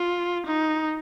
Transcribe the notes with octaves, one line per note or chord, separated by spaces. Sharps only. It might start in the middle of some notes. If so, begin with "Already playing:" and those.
Already playing: F4
D#4